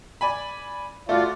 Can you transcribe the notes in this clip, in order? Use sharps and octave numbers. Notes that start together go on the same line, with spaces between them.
D5 G#5 B5
A3 F4 F#4 D5 F5